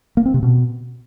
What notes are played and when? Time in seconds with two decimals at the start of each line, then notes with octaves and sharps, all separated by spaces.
0.17 A#3
0.26 C4
0.34 C3
0.42 B2